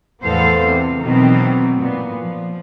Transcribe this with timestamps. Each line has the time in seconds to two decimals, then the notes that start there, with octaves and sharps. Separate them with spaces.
0.23 E2 A2 B3 A4 C5 F5
0.64 C3
1.02 B2 D#3 E3 F#3 C4
1.78 A#2 B3
2.19 F3